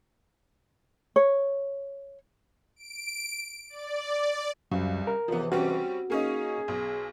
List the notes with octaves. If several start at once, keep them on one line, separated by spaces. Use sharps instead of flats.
C#5
D7
D5
C#2 F#2 C3 G3
A#4
C#2 C3 E3 F3 B3
G3 C4 C#4 F#4
A#3 C#4 D#4 G#4
B1